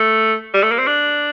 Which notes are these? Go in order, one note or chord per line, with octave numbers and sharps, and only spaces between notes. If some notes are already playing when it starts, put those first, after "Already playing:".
Already playing: A3
G3
A3
A#3
C4
D4